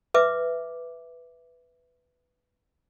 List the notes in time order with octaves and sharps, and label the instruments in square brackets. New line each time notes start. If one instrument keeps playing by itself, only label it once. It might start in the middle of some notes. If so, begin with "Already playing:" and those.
[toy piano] B4 E5 D6